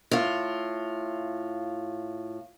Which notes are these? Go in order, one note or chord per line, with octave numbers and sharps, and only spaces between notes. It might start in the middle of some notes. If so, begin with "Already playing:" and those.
A2 F4